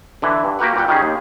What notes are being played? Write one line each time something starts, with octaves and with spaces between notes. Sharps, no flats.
D3 E3 E4
G2
A#3 F#4 G4 A#4 B4 F#5
A#2 G3 G4 F#5
D#3 G3 C#4 G#4
D#2